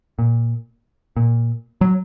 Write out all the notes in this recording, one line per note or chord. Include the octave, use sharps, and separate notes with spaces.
A#2
A#2
F#3